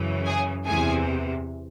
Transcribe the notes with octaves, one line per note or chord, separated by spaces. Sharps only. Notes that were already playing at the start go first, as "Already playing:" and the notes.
Already playing: F#2 C#3 E3
G#4 G#5
E2 C3 E3 G#4 G#5